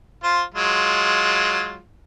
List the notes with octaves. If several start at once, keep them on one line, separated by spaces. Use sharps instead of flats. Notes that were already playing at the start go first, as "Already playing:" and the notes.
F4 C5
F#3 G#3 F4